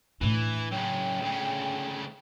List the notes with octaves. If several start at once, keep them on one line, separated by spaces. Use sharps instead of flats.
A2 E3 D4
F#2 C#3 G5
D2 C#3